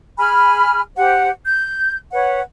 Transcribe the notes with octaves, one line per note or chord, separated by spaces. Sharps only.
G#4 G#5 B5 F6
G4 C5 F#5
G6
B4 C#5 F#5